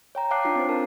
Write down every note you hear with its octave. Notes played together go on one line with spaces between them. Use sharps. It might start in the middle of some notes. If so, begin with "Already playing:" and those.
C#5 G5 A#5
C#5 F5 A5 D6 F#6 C7
D4 D#4 F4 F5 C7
C4 C5
D4 A#4 A5